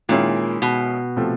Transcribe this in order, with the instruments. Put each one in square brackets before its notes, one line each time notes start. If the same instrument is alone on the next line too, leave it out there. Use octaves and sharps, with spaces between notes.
[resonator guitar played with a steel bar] A#2 [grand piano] D#3 G#3 C#4 E4 G#4
[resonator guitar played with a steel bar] B2
[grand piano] C3 F3 A3